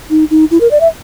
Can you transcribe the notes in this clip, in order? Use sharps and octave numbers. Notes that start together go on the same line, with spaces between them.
D#4
D#4
E4
A#4
D5
E5